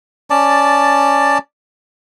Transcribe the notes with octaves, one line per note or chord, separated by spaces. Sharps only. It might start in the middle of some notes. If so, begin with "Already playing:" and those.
C#4 D5 A5